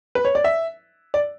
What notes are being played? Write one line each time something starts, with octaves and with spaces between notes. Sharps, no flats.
B4
C#5
D5
E5
D5